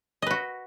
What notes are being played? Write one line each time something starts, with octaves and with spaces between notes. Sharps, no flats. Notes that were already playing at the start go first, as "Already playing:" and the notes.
F#4 B4 D#5